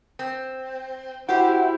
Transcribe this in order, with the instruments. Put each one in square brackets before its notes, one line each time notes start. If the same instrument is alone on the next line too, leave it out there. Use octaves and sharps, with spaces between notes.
[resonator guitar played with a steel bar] C4
[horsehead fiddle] E4 [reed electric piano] F#4 F#5 [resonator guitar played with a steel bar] G4 C5